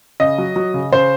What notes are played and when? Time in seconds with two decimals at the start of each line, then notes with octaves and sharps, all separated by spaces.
0.20 C#3 D#5
0.38 F#3
0.56 F#3
0.74 C#3
0.92 C#3 C5